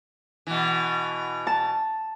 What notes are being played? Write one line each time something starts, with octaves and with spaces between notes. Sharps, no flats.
B2 E3
A5